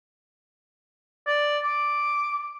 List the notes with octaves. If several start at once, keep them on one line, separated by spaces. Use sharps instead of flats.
D5
D6